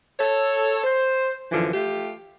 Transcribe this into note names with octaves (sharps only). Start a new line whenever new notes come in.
A4 C#5
C5
F#2 D3 E3 F3
A3 F4 G4